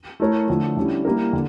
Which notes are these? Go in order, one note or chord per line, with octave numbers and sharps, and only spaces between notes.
A3 E4 A#4 C#5
D3 F3 A3
D3 G3 C#4 E4
G3 A#3 E4 G4 A#4
D3